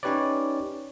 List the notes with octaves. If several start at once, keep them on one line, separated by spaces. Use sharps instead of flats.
C#4 D#4 G4 B4 C#5 D5